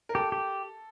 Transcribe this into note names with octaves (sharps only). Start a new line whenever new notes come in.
A#4
G4 A4
G4